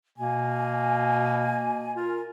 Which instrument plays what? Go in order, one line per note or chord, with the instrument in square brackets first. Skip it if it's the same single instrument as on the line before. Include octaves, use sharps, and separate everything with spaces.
[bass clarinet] B2 [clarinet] A#3 [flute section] G#5
[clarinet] F4 [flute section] A#4